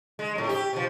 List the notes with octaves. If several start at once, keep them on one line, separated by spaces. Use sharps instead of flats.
G#3
F2 A2
G4
B2 F3